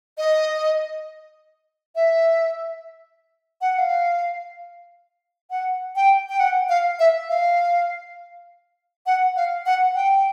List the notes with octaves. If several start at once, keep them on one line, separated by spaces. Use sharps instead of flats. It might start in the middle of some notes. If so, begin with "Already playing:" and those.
D#5
E5
F#5
F#5
F5
F#5
G5
G5
F#5
F5
E5
F5
F#5
F5
F#5
G5